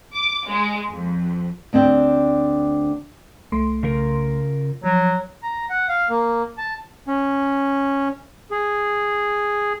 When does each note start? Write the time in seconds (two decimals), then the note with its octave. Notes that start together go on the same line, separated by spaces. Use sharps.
0.13 D6
0.47 G#3
0.90 F2
1.73 D2 C4 D4 G5
3.52 C2 A3 C6
3.83 C#3 F4 A#4
4.83 F3 F#3
5.43 A#5
5.70 F#5
5.89 F5
6.10 A#3
6.58 A5
7.07 C#4
8.51 G#4